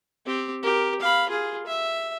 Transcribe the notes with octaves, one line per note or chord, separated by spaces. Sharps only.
C4 G4
G4 A#4
F5 B5
F4 G#4
E5